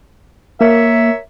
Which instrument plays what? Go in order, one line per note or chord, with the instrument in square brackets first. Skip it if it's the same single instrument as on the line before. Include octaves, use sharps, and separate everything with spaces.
[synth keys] A#3 [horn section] A#4 C#5 E5